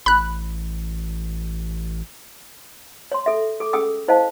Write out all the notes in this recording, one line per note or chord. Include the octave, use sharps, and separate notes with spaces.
A1 B5 F#6
C#5 C6
A4 E5
A4 D6
C#4 G#4 A4 G5 D#6 E6
E4 C5 D#5 F5 A5